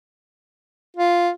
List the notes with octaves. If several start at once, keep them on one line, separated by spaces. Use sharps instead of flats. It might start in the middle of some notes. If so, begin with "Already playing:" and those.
F4